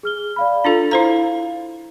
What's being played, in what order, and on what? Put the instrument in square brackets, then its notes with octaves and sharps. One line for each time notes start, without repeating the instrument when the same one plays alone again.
[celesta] G#4 F6 G7
D5 F5 B5
[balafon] D4 F4 A4 [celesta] A6
[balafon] E4 C5 A#5 [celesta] F5